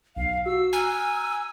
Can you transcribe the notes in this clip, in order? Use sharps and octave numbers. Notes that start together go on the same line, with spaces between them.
B1 F5
F#4 E6
G#5 A#5 F6 F#6